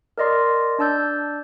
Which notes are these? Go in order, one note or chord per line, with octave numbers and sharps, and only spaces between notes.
A#4 D5 D#5 C6
D4 D5 A5 E6 G6